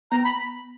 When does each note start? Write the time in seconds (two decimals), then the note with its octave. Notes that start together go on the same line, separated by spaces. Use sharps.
0.11 B3 A#5
0.24 B5